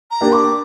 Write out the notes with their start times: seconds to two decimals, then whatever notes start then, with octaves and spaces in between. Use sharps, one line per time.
0.11 A#5
0.21 A#3 D4 G4
0.32 D6